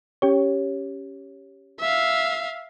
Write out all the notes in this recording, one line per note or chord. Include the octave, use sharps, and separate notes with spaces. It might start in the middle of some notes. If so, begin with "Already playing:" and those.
C#4 G4 C#5
E5 F5